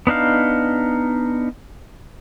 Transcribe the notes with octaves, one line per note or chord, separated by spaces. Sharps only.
B3 D4 D#4 F5